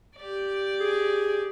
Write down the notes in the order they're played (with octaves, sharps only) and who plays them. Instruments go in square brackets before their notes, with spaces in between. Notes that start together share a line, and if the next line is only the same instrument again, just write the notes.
[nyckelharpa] G4 D5
[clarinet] G#4